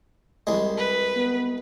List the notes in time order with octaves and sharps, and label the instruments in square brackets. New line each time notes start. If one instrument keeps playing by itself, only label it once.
[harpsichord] C2 G#3
[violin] B4
[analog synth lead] B3